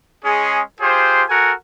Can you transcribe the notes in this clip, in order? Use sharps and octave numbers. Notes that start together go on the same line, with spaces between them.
G#3 C#4 G#4
F4 G4 G#4 C5
F#4 A4 A#4 F#5 G#5